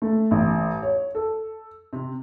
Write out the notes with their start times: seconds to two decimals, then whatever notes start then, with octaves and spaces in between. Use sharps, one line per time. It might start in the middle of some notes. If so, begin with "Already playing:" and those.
0.02 A3
0.31 A1
0.83 C#5
1.15 A4
1.93 C3